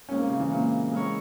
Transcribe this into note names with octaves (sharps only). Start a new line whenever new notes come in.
A#2 G#3 C4 C#4
A#3
C#3
E3
A#2 G#3 C4
G#3 E4 A#4 C#5